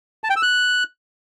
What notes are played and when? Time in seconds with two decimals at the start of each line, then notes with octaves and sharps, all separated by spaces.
0.24 A5
0.30 G5
0.36 E6
0.43 F#6